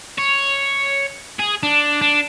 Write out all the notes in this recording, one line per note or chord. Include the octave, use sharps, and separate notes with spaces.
C#5
G#4
D4
D4